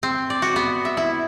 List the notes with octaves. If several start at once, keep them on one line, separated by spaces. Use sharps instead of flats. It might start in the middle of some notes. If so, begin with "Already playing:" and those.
C4
D5
F#4
B3
E5
E4